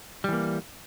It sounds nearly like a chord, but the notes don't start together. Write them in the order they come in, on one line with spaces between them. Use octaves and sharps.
G3 E3 A#3